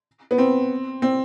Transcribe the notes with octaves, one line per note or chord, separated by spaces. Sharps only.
B3
C4
C4